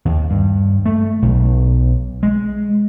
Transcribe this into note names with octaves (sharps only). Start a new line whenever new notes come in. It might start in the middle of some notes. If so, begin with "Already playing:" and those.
D#2
G2
A3
B1
G#3